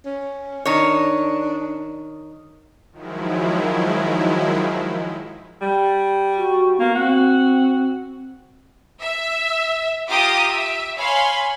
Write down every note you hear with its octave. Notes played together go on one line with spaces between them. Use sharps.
C#4
D#3 D4 C#5
D#3 F3 F#3 G#3 E4
G3
F#4
A#3 B3
C4 F#4
E5
F4 G4 A#5 D6 D#6
E5
C#5 F5 G#5 B5 C6